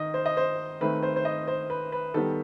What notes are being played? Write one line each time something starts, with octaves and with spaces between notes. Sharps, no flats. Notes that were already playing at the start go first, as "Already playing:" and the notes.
Already playing: D#3 D#5
C5
D#5
C5
D#3 A3 C4 B4
C5
C5
D#5
C5
B4
B4
D#3 G3 B3 A4